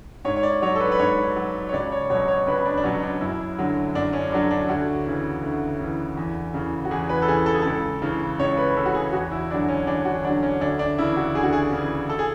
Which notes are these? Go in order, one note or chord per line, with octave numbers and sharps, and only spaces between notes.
G#2 C#5
C#5
D5
F#3 C#5
A4
B4
B4
G#2 C#5
F#3
C#5
C#2 D5
C#5
B2 F#3 C#5
C#5
C#2 B4
D4
D4
B2 F#3 C#4
D4
F#2 E4
D3 F#3
F#2 D4
C#4
D3 F#3 D4
D4
D2 F#4
C#3 E3
D2
C#3 E3
E2
C#3 E3
F#4
E2 G#4
B4
A4
C#3 E3 G#4
A4
G#4
C#2 A4
C#3 E3
C#2 C#5
B4
C#3 E3 A4
F#4
G#4
E2 F#4
E4
D3 F#3 D4
C#4
E2 D4
F#4
D3 F#3 D4
C#4
D2 D4
D4
C#3 E3 E4
F#4
D2 G#4
F#4
G#4
C#3 E3
A4
G#4